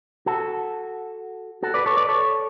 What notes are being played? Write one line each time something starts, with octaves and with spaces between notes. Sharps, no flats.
F#4 A4
F#4 A4
B4 D5
A4 C#5
B4 D5
A4 C#5